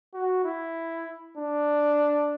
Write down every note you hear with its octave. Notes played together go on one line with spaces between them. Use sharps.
F#4
E4
D4